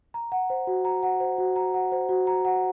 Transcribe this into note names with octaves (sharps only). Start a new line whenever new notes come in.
A#5
F#5
C5
F#4
A#5
F#5
C5
F#4
A#5
F#5
C5
F#4
A#5
F#5